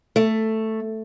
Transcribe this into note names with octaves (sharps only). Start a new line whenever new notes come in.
A3